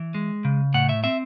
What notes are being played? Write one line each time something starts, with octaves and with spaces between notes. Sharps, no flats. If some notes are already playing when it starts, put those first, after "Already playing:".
Already playing: E3
G#3
C#3
A2 F#5
E5
C4 E5